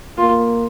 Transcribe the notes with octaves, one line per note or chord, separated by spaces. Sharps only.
A#3 F4